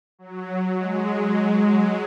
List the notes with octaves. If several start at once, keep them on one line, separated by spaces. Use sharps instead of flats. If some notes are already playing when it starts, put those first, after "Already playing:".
F#3
G#3